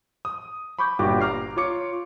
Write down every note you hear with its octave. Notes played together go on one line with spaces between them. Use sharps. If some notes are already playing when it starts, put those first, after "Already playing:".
D#6
B5 C#6 D6 G6
G1 A#2 F#4 G4 D6 F#6
A#5 D6 F6 C7
F4 C#5 D6 C#7